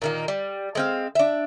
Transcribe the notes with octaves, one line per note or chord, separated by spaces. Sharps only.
A#2 D#3 A#3
G3
G#3 C4 F5
D4 E5